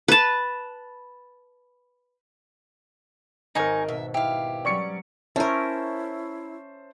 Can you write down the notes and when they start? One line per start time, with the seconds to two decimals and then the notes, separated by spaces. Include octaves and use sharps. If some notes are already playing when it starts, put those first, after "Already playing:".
0.08 B4 A5
3.55 G#1 G#2 D#4 A#4 C5 D#5 G#5 C#6
3.88 B2 E5
4.14 E4 G4 F5
4.65 F#3 G3 C#4 D5 C#6 C#7
5.36 C#4 E4 A#4 C5 C#5 E5 A5